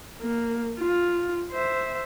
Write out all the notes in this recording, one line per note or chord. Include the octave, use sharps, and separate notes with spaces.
A#3
F4
C5 E5